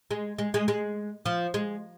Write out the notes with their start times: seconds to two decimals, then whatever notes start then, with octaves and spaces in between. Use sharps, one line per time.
0.11 G#3
0.38 G#3
0.54 G#3
0.68 G#3
1.26 F3
1.54 G#3